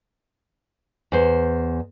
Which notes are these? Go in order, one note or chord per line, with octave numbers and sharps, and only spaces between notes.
E2 C5